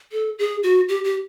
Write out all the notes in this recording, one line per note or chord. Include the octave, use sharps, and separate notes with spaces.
A4
G#4
F#4
G4
G4